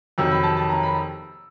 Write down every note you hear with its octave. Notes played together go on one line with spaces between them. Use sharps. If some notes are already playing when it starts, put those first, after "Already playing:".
F2 C3 D#3 F#3 E6
B5
A5
A5
A#5
B5